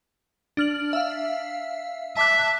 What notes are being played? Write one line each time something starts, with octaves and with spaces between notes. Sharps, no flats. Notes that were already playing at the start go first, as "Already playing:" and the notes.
D4 F6 F#7
E5 F5
E5 A5 D6 F#6